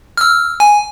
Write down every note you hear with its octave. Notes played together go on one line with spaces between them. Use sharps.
E6 F6
G#5